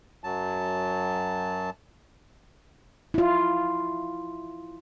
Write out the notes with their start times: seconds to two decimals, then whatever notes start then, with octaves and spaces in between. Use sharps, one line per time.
0.24 F#2 F#3 A5
3.14 E4 F4